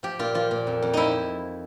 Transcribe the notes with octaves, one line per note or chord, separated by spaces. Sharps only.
F3 G4
A#2 F4
F3 F4
A#2
F2
F2
F3 D#4 E4